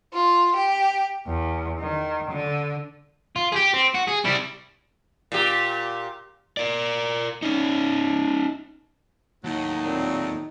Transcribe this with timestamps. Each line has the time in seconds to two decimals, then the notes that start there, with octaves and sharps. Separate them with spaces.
0.13 F4
0.55 G4
1.27 E2
1.79 D#3
2.31 D3
3.36 F4
3.52 G4 G#4
3.74 C4
3.94 F#4
4.07 G#4
4.24 G3 E4
5.32 A#2 G4
6.57 A#4 D5
7.42 C#4 D#4
9.44 D#2 A2 F#3 D#4
9.85 A#2 C4